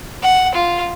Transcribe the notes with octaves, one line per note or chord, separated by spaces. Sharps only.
F#5
F4